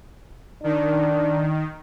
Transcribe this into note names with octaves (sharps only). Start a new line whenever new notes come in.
D#3 D4